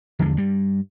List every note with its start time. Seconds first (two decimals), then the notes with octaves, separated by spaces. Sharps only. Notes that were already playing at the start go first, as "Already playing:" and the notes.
0.19 E2 D3 F3 G#3
0.37 G2 G3